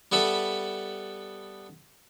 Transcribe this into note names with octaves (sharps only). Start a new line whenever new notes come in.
G3 B3 A4 E5 B5